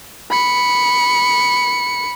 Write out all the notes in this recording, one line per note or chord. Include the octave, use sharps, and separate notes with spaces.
B5 C#7